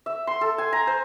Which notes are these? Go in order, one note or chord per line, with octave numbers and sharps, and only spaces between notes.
E5
C6
A4
G#5
A#5
C5